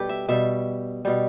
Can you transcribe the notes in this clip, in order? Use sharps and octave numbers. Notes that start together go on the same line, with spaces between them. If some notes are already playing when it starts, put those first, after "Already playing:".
Already playing: B2 G3 G4 A4 B4
E5
B2 G3 E5
B2 G3